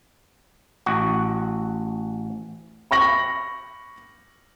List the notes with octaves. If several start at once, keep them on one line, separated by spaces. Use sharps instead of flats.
A1 F#4
B5 C#6 A#6 F#7